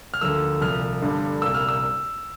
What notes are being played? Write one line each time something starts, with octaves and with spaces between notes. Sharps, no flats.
F6
D2 D3 F3 A#3 E6
C2 A#2 F3 F6
G1 G2 D3 G3
C2 A#2 G3 A#3 E6
F6
E6